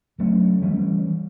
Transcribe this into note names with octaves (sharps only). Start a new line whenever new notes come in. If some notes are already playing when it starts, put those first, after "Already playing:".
C#3 F#3 A3 C#4
E3 G3 C#4